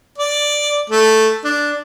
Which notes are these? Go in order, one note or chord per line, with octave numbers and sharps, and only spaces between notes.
D5
A3
D4